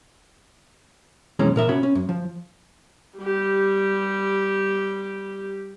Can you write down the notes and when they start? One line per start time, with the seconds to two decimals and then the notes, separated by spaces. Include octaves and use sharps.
1.39 B1 F2 E3 G#3 C#4 A#5
1.56 A#2 A#4 E5
1.69 C3 C#4 F#4 B5
1.83 C#4
1.95 F#2
2.09 F3
3.19 G3 G4